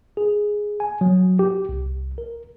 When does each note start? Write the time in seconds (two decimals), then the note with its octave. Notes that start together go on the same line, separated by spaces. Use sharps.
0.17 G#4
0.80 G#5
1.01 F#3
1.39 G4
1.69 C2
2.18 A#4